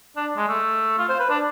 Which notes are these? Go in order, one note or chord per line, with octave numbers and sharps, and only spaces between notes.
D4
G#3
A3
F4
C5
B4
D4